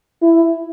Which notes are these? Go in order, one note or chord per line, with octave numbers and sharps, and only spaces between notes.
E4